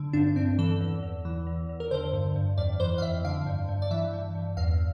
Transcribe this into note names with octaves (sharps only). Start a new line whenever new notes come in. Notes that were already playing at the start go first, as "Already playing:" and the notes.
Already playing: D3
G2 D4
G2 C4
E3 A4
E2
E2
E3
E2
E2
A#4
D3 C5
G2
G2
F2 D5
E3 C5
F5
F2 E5
D3 F5
G2
G2
D5
E3 E5
G2
G2
E2 F5